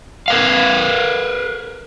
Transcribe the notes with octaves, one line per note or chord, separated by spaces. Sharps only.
A#4 B4 F5